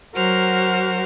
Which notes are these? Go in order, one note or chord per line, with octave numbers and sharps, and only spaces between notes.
F#3 F#4 A#4 C5 F6